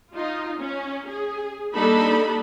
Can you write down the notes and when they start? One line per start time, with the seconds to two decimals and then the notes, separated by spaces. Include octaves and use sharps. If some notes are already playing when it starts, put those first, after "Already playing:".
0.15 D#4 F4
0.61 C#4
1.09 G#4
1.76 G3 A#3 D4 D#4 A4 B5